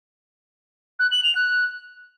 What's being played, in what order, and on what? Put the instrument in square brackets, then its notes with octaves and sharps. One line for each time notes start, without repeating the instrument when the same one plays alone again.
[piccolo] F#6
F#7
F7
F#6